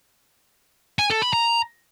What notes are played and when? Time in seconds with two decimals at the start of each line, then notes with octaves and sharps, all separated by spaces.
0.99 G#5
1.10 A4
1.22 B5
1.33 A#5